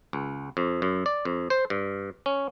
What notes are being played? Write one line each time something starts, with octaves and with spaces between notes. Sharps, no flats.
C#2
F2
F#2
D5
F2
C5
G2
C#4